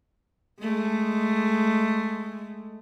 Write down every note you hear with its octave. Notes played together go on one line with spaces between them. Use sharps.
G#3 A3